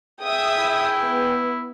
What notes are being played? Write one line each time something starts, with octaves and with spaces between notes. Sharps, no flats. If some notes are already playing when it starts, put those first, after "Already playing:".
G#4 E5 G5 D#6
E4
B3